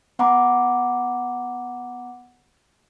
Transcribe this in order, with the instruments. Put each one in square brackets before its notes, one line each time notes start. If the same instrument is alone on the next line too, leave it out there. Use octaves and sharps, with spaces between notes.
[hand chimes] B3 F#5 A#5 B5 D6